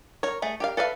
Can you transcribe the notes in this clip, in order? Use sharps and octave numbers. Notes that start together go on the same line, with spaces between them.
A#4 C#5
A3 G#4
G4 A#4 F5
A4 B4 E5 F5